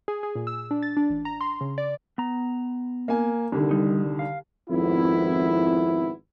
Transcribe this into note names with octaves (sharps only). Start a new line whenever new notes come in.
G#4
G#4
A#2
E6
D4
A6
D4
A1
A#5
C6
C#3
D5
B3 A#5
A#3 G#5
C2 D3 D#3
G3 D#4
F5
G#1 F2 B3 E4